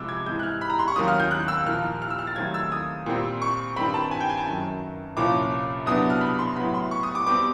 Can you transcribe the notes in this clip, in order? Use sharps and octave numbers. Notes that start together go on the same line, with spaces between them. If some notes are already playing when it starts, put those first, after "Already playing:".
Already playing: C2 C3 F3 G#3 D6 E6
G#6
G#2 E3 G#3 G6
F#6
F6
B5
A#5
C6
C#6
D#2 D#3 F#3 A#3 C#4 D#6
F6
G6
F#6
E6
A#2 F3 A#3 F6
F6
F6
E6
F6
A6
D#2 D#3 F#3 A3 C4 G#6
E6
D#6
A#2 G3 C4
C#6
G2 D#3 G3 C4 B5
A5
G#5
G5
G#5
A5
F#2 D#3 F#3
C2 A#2 F3 A#3 C#4 D6
C2 B2 F#3 B3 D4 D#6
F6
B5
C6
A2 F#3 B3 B5
C6
C#6
D#6
D6
B2 G3 C4 D6